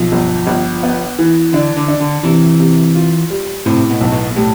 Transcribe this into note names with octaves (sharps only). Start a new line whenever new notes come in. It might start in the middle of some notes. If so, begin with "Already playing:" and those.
Already playing: B1 F3
G1
G1
B3
E3
D3 D4
D3
D4
D3
C3 E3
C3
F4
G3
A2 C3
B2
B1
B2
A2 G3